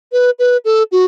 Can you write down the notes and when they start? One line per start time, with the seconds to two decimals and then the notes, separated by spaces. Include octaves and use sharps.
0.12 B4
0.39 B4
0.65 A4
0.92 F#4